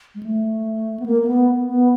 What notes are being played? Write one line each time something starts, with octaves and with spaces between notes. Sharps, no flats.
G#3
A3
B3
A#3
A#3
B3
B3